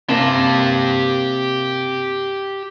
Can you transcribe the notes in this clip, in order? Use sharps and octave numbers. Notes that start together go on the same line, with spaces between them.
C3 A#3 G4 A5